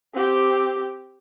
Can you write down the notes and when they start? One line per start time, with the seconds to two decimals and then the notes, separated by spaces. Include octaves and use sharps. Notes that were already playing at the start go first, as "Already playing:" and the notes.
0.14 C4 G4